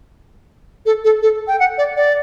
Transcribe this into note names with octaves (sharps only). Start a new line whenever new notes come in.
A4
A4
A4
G5
F#5
D5
D5